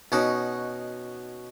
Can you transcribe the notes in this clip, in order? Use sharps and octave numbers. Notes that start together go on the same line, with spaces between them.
B2 C#4 D#4 F#4